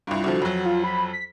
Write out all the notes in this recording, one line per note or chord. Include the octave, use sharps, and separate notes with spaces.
C2 G2 F4
C2 D3 F3 F#4
F2 F#3
F4
B5
B6